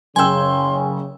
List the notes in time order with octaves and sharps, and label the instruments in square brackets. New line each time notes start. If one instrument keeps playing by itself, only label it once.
[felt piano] F#1 E6 [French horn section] C#3 [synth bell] G5 G#5 [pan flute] C6